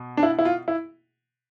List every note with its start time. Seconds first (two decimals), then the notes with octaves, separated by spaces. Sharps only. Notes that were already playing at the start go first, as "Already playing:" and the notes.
Already playing: B2
0.17 D4
0.23 E4
0.39 E4
0.45 F4
0.68 E4